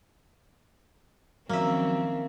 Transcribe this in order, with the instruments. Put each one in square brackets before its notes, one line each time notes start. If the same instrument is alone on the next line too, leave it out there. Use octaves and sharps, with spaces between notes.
[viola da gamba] D#3 C4 C#4 [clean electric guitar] F3 F#3 [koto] A#3 E5